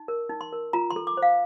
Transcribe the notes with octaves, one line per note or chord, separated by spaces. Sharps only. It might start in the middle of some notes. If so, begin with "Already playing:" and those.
Already playing: D#4
A#4
D#4
C6
A#4
F4 A#5
C6
A4
D6
C5
F5